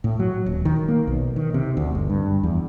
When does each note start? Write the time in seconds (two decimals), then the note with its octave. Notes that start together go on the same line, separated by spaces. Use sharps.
0.04 A2
0.19 F#3
0.46 D#1
0.65 D#3
0.88 A#3
1.07 B1
1.36 D#3
1.54 C3
1.77 D2
1.95 G1
2.10 G2
2.43 E2